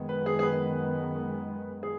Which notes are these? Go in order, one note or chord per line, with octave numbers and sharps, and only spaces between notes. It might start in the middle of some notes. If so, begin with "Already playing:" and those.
Already playing: F#2 D#3 G#3 B3
B4
G#4
G#4
B4
G#4